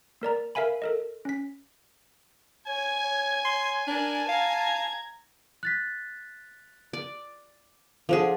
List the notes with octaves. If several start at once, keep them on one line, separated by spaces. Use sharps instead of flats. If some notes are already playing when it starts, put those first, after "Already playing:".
A#3 A#4 D5 A#5
A#4 E5 F5 G#5 B5
A4 A#4 D#5
C#4 B6
C#5 G#5 G#6
C#5
C#5 C6
D4 A#4 A5
F5 A#5 G#6
F#6 A6 B6
D5
F3 D4 G#4 A4 C5 F#5